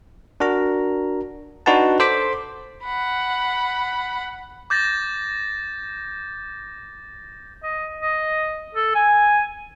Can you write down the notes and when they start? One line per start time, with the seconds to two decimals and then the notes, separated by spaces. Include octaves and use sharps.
0.40 D4 F#4 A#4 A#5
1.66 D4 D#4 F#4 B4 F#5 A5
1.99 A4 C5 C6 D6 B6
2.85 F#5 B5
4.70 D6 G6 A6 A#6
7.63 D#5
8.01 D#5
8.75 A4
8.95 G#5